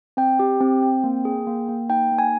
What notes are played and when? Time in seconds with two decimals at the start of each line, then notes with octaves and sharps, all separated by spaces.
0.17 C4 G5
0.39 G4
0.61 C4
0.83 C4
1.04 A#3
1.25 G#4
1.47 A#3
1.69 A#3
1.90 D#4 G5
2.11 A#3
2.18 G#5